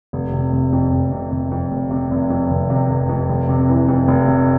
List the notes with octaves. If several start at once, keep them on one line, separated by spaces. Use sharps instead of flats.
F1
C3
F1
F2
F1
C3
F1
F2
F1
C3
F1
F2
F1
C3
F1
F2
F1
C3
E3
F2
F1
C3